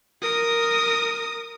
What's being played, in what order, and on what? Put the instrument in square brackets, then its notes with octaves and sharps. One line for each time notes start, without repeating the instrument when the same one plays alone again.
[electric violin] A#4 D#6